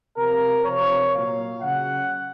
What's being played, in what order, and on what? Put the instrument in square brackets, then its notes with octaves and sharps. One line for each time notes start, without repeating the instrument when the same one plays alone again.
[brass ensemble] C3 F3 A#4
C3 F3 C#5
A#2 F#3 F5
C#3 F#3 F#5